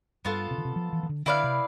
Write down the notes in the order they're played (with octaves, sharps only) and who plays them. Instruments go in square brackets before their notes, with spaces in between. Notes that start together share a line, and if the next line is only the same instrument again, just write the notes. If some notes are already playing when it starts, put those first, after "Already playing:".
[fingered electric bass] G2 [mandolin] B3 F4 A4
[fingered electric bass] C3
D3
C3
F3
E3
E3
D3
[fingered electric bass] D3 [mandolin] E4 B4 D5 F5
[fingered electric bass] C3